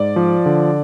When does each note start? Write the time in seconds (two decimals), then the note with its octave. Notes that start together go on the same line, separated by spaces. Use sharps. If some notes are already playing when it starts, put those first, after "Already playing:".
Already playing: G#2 D5
0.16 F3
0.46 D3